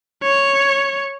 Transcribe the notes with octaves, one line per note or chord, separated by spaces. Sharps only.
C#5